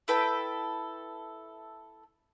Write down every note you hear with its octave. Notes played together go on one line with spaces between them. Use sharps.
E4 A4 B4 G5